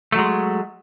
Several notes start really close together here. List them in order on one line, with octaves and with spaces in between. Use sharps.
A3 F#3 G#3